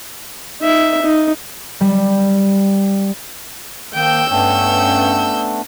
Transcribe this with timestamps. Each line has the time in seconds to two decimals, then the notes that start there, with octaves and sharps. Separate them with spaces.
0.62 D#4 E5
1.02 D#4
1.81 G3
3.95 D#3 F3 A#3 G5 E6 G6
4.31 G2 A3 B3 C#4 D4 G5